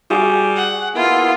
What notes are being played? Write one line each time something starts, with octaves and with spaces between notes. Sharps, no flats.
G3 F#4 G#4 D6
F#5
A#3 B3 E4 F4